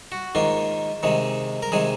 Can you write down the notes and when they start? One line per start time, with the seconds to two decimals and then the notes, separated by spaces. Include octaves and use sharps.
0.12 F#4
0.35 G#2 D#3 A#3 F4
1.03 C3 D#3 G#3
1.62 A#4
1.72 C3 D#3 G#3 G#4